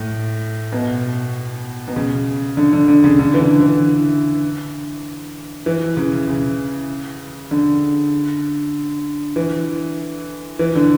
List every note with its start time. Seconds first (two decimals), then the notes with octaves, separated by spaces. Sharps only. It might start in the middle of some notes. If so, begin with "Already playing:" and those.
Already playing: A2
0.73 B2
1.88 B2
1.96 C#3
2.57 D3
2.73 D3
2.88 D3
3.04 C#3
3.19 D3
3.34 E3
3.40 D3
3.60 E3
5.66 E3
5.97 C#3
6.28 C#3
7.51 D3
9.36 E3
10.59 E3
10.75 D3